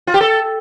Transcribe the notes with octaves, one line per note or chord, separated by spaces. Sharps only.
F4
G4
A4